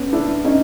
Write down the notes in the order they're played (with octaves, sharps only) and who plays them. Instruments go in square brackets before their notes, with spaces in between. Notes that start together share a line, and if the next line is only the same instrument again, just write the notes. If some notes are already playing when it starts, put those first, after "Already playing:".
Already playing: [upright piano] B3 C#4
D4 E4
C#4 D#4